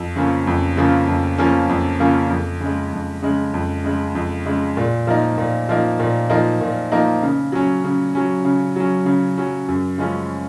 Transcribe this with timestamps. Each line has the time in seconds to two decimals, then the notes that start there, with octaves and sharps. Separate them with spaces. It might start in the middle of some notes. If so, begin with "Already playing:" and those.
Already playing: F2
0.16 C#3 F3 A#3 C#4
0.47 F2
0.77 C#3 F3 A#3 C#4
1.08 F2
1.38 C#3 F3 A#3 C#4
1.69 F2
2.00 C#3 F3 A#3 C#4
2.30 F2
2.61 C#3 G#3
2.93 F2
3.22 C#3 G#3
3.54 F2
3.84 C#3 G#3
4.15 F2
4.46 C#3 G#3
4.77 A#2
5.07 F3 A#3 D#4
5.38 A#2
5.69 F3 A#3 D#4
5.99 A#2
6.30 F3 A#3 D#4
6.61 A#2
6.92 F3 A#3 D#4
7.22 C#3
7.52 F#3 C#4
7.84 C#3
8.15 F#3 C#4
8.45 C#3
8.76 F#3 C#4
9.06 C#3
9.38 F#3 C#4
9.68 F#2
9.98 C#3 F3 G#3 C#4